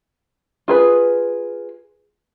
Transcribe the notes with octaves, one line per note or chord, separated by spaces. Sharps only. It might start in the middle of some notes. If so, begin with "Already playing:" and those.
F4 G#4 B4